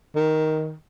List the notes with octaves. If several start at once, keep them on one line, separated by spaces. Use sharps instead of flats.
D#3